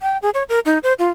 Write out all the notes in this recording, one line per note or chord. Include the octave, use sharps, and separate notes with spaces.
G5
G#4
C#5
A#4
D#4
C5
F4